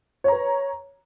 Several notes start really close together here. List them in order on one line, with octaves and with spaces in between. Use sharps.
C#5 A#5 B4